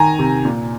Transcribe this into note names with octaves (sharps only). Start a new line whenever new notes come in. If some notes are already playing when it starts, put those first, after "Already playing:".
Already playing: D#3 G#5 A#5
C3
A#2